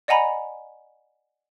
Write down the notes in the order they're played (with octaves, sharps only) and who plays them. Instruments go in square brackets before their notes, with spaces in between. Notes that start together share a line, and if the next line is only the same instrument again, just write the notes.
[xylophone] D5 D#5 F#5 G#5 A#5 B5